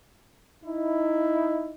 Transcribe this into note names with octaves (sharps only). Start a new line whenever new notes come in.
D#4 E4